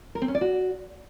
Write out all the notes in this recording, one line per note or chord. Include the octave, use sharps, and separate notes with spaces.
A#4
C4
C#4
D5
F#4